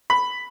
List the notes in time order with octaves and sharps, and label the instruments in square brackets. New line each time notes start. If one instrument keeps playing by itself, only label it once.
[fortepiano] B5